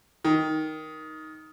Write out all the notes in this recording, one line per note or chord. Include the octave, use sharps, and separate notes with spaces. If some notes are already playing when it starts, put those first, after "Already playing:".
D#3